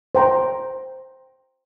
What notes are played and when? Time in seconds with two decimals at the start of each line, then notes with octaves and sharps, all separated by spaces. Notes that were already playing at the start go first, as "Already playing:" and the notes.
0.15 C5 G5 A#5